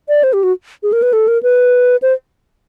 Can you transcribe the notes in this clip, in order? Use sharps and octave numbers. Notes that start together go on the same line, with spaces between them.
D5
C5
G4
F#4
G#4
A#4
B4
A4
A#4
B4
C5